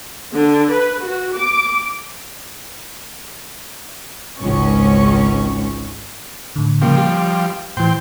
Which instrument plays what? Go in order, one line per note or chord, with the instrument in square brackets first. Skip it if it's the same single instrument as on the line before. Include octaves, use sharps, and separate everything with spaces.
[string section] D3
B4
F#4
D6
G#1 C#2 C#4 C#6
[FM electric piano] A2 D3
[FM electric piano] C#3 A#3 [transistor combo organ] F3 G3
[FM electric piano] G4
[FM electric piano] A2 E3 [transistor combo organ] C5 G5